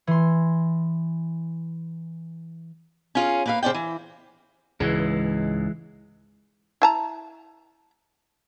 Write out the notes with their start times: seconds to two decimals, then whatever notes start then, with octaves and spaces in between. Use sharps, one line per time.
0.07 E3 C6
3.15 C#4 F4 G#4
3.46 A#3 B4 F5
3.63 C#3 C5 D5 G5
3.74 E3
4.80 C#2 G#2 E3 G#3
6.82 E4 A5 A#5